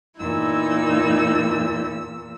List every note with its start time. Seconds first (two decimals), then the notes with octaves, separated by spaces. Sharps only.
0.19 E2 A#2 D#4 E4 E6